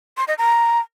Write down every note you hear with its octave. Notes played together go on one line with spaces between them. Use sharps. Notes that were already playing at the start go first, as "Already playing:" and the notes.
C6
D#5
A#5